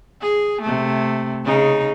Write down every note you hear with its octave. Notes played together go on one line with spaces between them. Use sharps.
G#4
C3 A3
C#3 D#4 G#4